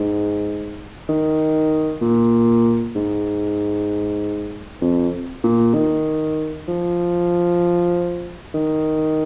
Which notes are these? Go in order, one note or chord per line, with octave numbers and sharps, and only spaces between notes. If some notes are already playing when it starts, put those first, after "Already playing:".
Already playing: G#2
D#3
A#2
G#2
F2
A#2
D#3
F3
D#3